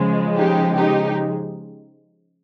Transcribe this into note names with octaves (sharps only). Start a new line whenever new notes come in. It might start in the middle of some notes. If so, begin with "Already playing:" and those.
Already playing: C#3 F3 G#3
D#4 G4
D#4 G4